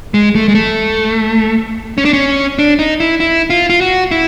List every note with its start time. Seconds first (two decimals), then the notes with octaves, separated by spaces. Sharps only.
0.14 G#3
0.35 A3
0.48 G#3
0.55 A3
1.98 C#4
2.05 D4
2.13 C#4
2.59 D4
2.79 D#4
3.00 E4
3.20 E4
3.50 F4
3.70 F4
3.81 F#4
4.11 E4